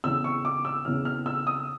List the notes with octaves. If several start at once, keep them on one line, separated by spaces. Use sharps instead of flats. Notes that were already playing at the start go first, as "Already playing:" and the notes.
E2 C#3 E3 E6
C#6
D6
E6
E2 C#3 E3 F6
F6
E6
D#6